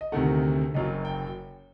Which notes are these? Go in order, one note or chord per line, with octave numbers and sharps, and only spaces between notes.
D#5
D2 C3 D#3 A3 F#5
F#1 F#2 F#3 D#5
G5